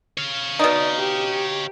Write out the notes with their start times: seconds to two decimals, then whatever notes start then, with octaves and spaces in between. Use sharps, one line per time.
0.17 C#5 F5
0.59 B2 D#4 D5 D#5
0.99 G4